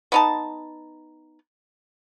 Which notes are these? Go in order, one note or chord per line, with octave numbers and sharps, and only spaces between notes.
B3 D#4 A5